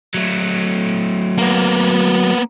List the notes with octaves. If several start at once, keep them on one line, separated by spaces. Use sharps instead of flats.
F#3 A3
A#3 B3